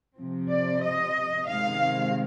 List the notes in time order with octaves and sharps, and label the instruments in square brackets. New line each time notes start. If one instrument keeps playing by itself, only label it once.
[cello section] C3 F3 C4
D5
D#5
C3 D#3 G#3 C4 F5